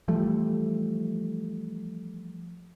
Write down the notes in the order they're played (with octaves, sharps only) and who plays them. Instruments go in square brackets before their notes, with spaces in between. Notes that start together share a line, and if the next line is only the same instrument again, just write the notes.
[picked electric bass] E3 F3 G3 A3